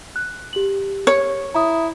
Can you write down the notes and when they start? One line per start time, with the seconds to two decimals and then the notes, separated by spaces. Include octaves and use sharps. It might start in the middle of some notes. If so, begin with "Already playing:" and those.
0.16 F#6
0.53 G4 F#7
1.07 C#5
1.55 E4 A#5 D#6